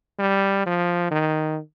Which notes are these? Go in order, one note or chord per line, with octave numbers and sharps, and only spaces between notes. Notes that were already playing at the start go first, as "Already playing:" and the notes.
G3
F3
D#3